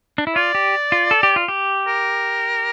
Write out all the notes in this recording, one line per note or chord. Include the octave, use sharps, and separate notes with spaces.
D4
E4
F4 D5
G4
F4
A4
G4
F4
G4
A#4